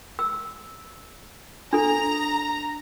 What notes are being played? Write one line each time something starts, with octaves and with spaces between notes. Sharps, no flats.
E6
D4 A4 A#5